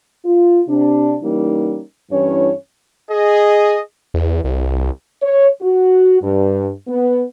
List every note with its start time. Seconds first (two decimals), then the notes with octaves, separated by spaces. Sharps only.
0.25 F4
0.68 C3 D4
1.23 E3 G3 A#3 C#4 D#4
2.11 G2 E3 C#4 E4 C#5
3.11 G#4 D#5
4.14 E2
4.44 C2
5.22 C#5
5.60 F#4
6.21 G2
6.88 B3